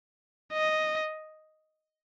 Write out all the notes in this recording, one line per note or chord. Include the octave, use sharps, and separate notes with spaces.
D#5